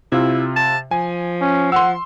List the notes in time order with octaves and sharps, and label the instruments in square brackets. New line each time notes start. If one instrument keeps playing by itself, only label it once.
[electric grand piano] C3 F4 [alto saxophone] E4
[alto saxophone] A5
[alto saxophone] F3 [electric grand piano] G#5
[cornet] C#4
[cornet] F#5 [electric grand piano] C6 E6